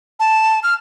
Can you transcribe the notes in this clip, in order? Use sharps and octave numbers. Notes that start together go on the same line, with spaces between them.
A5
F6